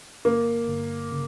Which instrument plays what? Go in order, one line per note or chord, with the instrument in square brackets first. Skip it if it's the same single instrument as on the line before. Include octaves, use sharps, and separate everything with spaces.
[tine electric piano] G1 [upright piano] A#3
[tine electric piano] G1
C#3